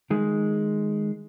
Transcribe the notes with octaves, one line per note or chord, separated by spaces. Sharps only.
D#3 G#3